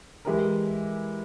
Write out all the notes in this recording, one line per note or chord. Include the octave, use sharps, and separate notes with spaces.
E3 G#3 E4 G4 A#4